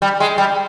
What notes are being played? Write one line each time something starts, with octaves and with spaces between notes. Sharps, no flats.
G3
G#3
G3